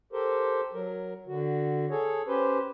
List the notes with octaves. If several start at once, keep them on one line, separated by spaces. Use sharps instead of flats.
G4 A4 A#4 C5
F#3 A#4
D3 F#4
G#4 A4 C#5
C#4 G4 B4 C5